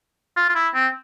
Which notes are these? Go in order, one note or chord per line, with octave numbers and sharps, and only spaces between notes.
F4
F4
E4
C4